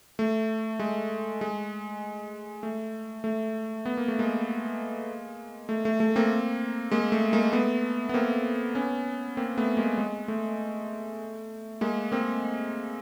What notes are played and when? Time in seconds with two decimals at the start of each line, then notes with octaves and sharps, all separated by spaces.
0.19 A3
0.79 G#3
1.41 G#3
2.63 A3
3.24 A3
3.86 B3
3.97 A#3
4.08 A3
4.19 G#3 A#3
5.69 A3
5.85 A3
6.00 A3
6.16 A#3 C4
6.91 G#3 A#3
7.12 A3
7.33 G#3 A#3
7.53 A3 B3
8.09 B3
8.14 A#3 C4
8.75 B3 C#4
9.37 A#3 C4
9.57 A3 B3
9.77 G#3 A#3
9.98 G#3
10.28 A3
11.81 G#3 A#3
12.12 A#3 C4